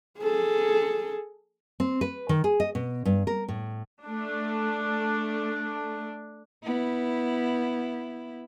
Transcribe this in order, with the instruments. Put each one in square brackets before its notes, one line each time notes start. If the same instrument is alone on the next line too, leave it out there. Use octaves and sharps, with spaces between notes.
[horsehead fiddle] G#4 A4
[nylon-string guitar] C4
B4
D#3
G#4
D#5
B2
G2
A#4
A2
[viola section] A3 D4
[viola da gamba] B3 E4